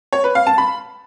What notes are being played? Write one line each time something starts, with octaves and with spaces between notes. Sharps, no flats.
C#5
B4
F5
A5
B5